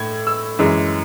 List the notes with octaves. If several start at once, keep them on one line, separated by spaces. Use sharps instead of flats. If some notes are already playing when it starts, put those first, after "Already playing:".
Already playing: A2 G#6
E6
F#2 E3 G#3